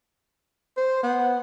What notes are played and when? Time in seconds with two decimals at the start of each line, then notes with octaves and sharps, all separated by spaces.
0.77 C5
1.03 B3